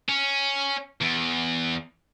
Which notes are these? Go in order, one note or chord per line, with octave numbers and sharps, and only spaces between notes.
C#4
E2